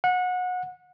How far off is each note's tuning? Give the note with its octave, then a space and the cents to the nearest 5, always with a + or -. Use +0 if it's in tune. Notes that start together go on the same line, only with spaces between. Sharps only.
F#5 -25